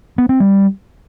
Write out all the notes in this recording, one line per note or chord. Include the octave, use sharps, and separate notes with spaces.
B3
C4
G3